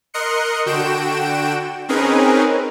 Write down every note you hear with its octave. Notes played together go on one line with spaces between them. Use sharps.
A#4 D#5 C6 F#6 C#7
D3 F#4 G5 D7 E7
C4 C#4 D#4 G#4 A#4 B4